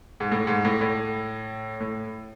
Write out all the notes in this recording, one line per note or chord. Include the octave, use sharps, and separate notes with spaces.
G#2
A2
G#2
A2
A2
A2